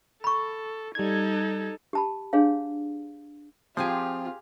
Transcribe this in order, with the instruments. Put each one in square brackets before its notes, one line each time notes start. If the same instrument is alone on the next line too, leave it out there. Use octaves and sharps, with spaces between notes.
[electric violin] A4 [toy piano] B5 C#6
[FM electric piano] G3 G#6 [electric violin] D#4 A4
[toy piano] G4 A5 B5
D4 G#4 C#5 F5
[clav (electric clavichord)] F3 G#5 [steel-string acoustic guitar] C4 [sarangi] F4 [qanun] G4 G#4 C6